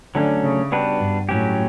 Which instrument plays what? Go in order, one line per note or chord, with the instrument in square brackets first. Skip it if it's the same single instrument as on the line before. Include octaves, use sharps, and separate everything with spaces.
[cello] D3 [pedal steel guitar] F#3 A3 C#4
[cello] C#3
[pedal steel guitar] G3 B3 D4 F#4 B4
[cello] G2
[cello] A2 [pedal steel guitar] F#3 C#4 G4